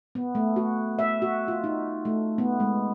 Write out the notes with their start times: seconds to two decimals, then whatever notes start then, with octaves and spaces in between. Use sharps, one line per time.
0.15 B3
0.35 A3
0.56 F#4
0.99 E5
1.22 F#4
1.48 F4
1.64 D#4
2.05 A3
2.38 B3
2.60 G#3